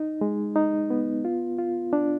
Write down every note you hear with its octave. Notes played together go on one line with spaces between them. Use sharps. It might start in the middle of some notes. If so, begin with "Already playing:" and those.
Already playing: D#4
G#3
D#4
B3
F4
F4
D4